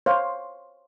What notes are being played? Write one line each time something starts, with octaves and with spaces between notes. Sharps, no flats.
C5 C#5 F5